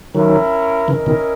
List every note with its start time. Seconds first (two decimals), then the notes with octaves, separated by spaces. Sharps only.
0.15 D#3 F#3 C#4 E4 A#4
0.88 C#3 E3 C#4 E4 A#4 D#5
1.06 B2 D#3